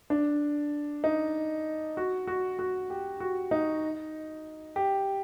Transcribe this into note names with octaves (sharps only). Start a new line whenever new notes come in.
D4
D#4
F#4
F#4
F#4
G4
F#4
D#4
G4